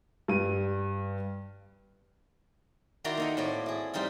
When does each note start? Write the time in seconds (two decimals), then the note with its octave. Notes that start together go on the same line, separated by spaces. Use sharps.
0.28 G2 D#7
3.04 D#3 E4 F#4 D5 A#5 C6
3.17 A#3 D#4 A4
3.37 A2 C4 D5
3.66 E4 G#4
3.94 G3 C4 D#4 F4